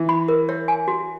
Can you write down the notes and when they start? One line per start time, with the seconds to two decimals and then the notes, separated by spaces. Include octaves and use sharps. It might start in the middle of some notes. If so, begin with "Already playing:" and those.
Already playing: E3
0.09 B5
0.28 A#4
0.49 C#5
0.68 G#5
0.88 F#4